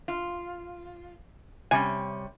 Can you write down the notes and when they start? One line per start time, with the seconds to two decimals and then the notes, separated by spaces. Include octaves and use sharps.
0.08 F4
1.71 C3 G3 C#4 G#5